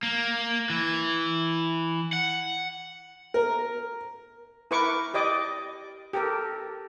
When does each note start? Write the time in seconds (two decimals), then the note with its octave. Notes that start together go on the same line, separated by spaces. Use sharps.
0.03 A#3
0.70 E3
2.13 F#5
3.34 A#4
4.71 E4 A#4 B4 C#6 D6
5.14 G4 D5 D#5 D6
6.13 G4 A4 A#4